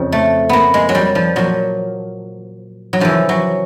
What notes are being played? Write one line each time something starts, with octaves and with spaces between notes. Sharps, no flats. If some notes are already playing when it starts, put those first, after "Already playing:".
Already playing: F2 C#3 F3
A3
A#3 B3
G#3
F#3
G3
F3
A#2 F3 F#3
F#3
F#2 C#3 E3 F3
F#3